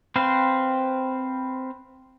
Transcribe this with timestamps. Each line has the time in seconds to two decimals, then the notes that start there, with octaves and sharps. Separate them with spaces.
0.16 C4 B4 C5 F5